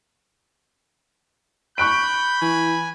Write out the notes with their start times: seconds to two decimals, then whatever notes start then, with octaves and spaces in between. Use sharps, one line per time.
1.78 B5 C#6 F#6 G6 D7
2.42 E3 G#5